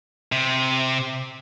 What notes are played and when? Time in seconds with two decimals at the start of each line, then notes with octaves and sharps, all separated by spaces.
0.32 C3